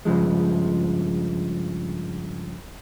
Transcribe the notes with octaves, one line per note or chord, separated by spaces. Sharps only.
G2 C#3 F3 G#3